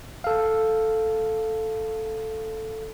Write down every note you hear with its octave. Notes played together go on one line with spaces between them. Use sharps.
A4 F5